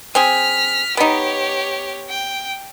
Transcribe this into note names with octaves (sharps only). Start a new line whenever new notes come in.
C4 G#4 F6 B6
B3 D#4 G4 C#5
G5